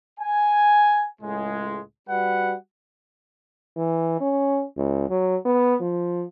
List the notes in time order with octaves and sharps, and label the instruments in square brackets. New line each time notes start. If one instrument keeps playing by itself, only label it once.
[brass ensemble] G#5
C#2 A2 G#3
G3 F#4 B4 F#5
[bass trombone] E3
C#4
C#2
F#3
B3
F3